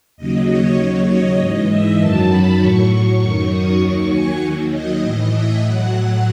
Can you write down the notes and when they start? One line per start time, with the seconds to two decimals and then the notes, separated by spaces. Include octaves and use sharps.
0.17 D#2 C#3 F#3 D#5
0.48 C#5
0.78 D#2 C#3 F#3
1.08 D#5
1.39 G#2 E3
1.69 E5
1.98 F#2 D#3 F#3 A5
2.29 B5
2.59 A2 F#3 C#6
3.19 F#2 D#3 F#3
3.51 D#6
3.80 D#2 D#3 F#3 C#6
4.11 G#5
4.41 D#2 D#3 F#3
4.72 D#5
5.02 A2 E3
5.32 E5
5.62 A2 F#3 F#5